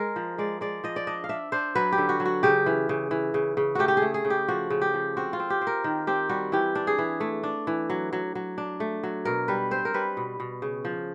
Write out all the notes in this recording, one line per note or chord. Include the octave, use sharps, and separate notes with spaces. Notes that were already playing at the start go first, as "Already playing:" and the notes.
Already playing: G#3 A#4
F3
G#3 D5
G#3 D5
F3 D#5
D5
D4 D#5
F5
D4 E5
D4 C5
F#3 B4
G4
D3
F#4
F#3
F#4
C#3 G4
E3
C#3
E3
C#3
C#3
A3 F#4 G4
G4
G#4
A3
G#4
C#3
G4
F3 F#4
C#3
G4
F3
C4 F#4
F4
C4
G4
C4
A#4
D#3
C4 G4
G3 F#4
E3 G4
D4
G#4
E3
A3
D4
E3
F#3
F#3
F#3
D4
A3
F#3
B2 A#4
G3 B4
C4 C5
A#4
G3 B4
B2
B2
C#3
F3